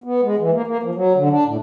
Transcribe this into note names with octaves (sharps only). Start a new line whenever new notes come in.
B3
G#3
E3
A#3
A#3
F3
F#3
D3
D4
A2